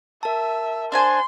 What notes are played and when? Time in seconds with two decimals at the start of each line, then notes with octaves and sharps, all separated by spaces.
0.23 A#4 E5 A5
0.92 D4 C5 G#5 C6